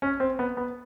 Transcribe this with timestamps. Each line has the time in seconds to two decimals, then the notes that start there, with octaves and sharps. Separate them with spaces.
0.02 C#4
0.20 C4
0.39 B3
0.57 B3